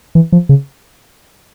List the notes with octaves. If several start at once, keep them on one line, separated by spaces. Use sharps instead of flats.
E3
F3
C#3